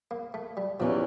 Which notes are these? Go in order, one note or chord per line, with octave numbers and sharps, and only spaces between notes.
A#3
A3
G3
E2 E3 F3 G3 C#4